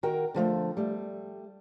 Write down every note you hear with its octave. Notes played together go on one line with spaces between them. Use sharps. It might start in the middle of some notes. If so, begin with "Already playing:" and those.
D#3 F#4 A#4 G5
D3 F3 F#3 A3
G3 A3